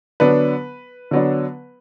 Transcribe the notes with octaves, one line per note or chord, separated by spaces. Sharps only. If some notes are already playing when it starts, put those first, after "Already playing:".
D3 F#3 B3 D4 B4
D3 F#3 B3 D4